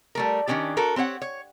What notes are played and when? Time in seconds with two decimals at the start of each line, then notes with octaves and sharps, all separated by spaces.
0.15 G3 A3 A#4
0.47 D#3 G#3 C#4 D4 G4
0.77 F#4 A4 A#4
0.96 C4 G4 C#5 F#5
1.22 C#5